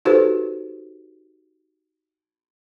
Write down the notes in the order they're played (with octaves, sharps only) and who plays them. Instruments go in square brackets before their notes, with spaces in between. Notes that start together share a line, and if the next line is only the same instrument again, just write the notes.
[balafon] D#4 F#4 G4 A4 B4 C5